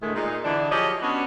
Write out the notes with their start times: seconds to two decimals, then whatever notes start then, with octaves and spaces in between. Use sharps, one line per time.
0.03 A2 D3 D#3 G#3 A3
0.15 A#2 G#3 D#4
0.45 D3 E3 D4
0.72 F3 F#3 G4 G#4 C#5 D#5
1.02 B3 C#4 D4 F#4